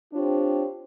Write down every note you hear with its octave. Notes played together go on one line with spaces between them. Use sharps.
C4 D4 F4 G4 C#5